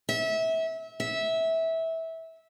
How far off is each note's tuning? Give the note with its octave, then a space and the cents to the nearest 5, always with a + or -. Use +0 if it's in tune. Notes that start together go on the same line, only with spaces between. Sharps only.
E5 -25
E5 -20